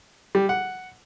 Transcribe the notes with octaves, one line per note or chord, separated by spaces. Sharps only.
G3
F#5